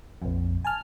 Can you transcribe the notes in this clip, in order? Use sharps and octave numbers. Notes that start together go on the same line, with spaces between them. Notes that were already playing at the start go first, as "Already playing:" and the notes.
A#1 F2
G#5 A5 F6